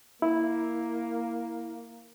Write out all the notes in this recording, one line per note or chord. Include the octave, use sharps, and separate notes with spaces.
A#3 E4